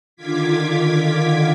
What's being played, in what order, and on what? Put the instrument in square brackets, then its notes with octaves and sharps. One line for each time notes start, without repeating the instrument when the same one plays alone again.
[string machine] D3 D#3 F4 D6 G#6 B6